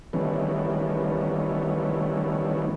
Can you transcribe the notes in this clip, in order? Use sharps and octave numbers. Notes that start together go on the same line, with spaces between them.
D#3 E3 G3 A3 B3 C#4